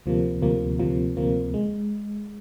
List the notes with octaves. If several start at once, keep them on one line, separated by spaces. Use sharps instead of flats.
D2 C3 F3 A#3
D2 C3 F3 A#3
D2 C3 F3 A#3
D2 C3 F3 A#3
G#3